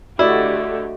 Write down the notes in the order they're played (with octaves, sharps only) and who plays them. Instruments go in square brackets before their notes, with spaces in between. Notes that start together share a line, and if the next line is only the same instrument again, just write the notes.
[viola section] D3 A3 G4 [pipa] E4 [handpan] F#4 D5 D#5